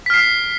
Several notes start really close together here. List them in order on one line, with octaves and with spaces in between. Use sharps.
B6 F6 C7